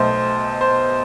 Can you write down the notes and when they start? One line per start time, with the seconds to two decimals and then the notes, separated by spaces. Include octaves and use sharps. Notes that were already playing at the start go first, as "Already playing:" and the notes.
Already playing: B1 B2 A3 C5
0.61 C5